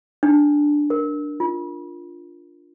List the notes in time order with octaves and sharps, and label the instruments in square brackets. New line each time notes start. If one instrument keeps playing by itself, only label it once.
[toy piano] D4
A#4
F4